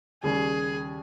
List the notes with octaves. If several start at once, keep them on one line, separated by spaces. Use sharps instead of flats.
D#2 C#3 G3 G#4